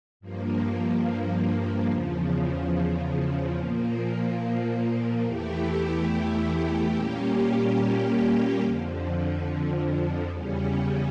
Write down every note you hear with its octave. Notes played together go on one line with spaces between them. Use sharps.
G2 F3 A#3
E2 C#3 F3
A#2 F3 A#3
E2 E3 A3 E4 G4
A#2 G3 A#3 C#4 G4
F2 D3 F3
E2 C#3 G3 C#4